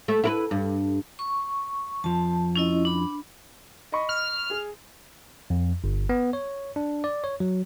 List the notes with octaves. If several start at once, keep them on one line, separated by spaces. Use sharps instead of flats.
A3
E4 A#4 B4
G2
C#6
F2 F3 A5
C#4 E4 D#5
D4 B5
D#5 B5 C#6
F6
G#4
F2
G1
B3
C#5
D4
D5
C#5
F#3